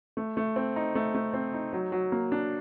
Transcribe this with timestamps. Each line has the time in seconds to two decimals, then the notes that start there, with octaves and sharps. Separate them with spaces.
0.17 A3
0.37 A3
0.56 C4
0.76 D#4
0.95 A3
1.15 A3
1.34 C4
1.54 D#4
1.73 F#3
1.92 F#3
2.12 A#3
2.32 D4